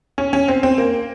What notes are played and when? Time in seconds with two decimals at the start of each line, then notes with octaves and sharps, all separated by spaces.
0.18 C#4
0.33 C#4
0.48 C4
0.63 C4
0.78 A#3